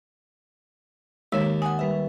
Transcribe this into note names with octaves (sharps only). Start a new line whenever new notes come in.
D#2 G#3 C#5 B6 E7
F#5 G#5 D#6
G3 B4 E5